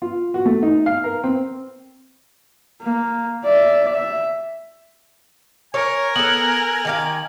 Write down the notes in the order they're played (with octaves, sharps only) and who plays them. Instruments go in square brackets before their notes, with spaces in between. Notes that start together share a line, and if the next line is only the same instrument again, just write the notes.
[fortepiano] F4
F#4
A3
D#4
F5
A#4
C4
[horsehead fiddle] A#3
D5 E5
E5
[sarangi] A#4 [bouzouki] C#5 [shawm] G#5
[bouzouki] B3 A4 [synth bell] F#7
[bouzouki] D#3 G4 F5